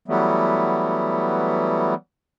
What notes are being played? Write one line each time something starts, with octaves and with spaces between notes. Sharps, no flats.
E3 F#3 G3 A3 B3